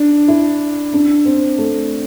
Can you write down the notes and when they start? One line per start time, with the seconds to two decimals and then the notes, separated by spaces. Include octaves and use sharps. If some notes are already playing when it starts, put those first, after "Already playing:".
Already playing: D4
0.28 E4
0.94 D4
1.25 C4
1.58 A3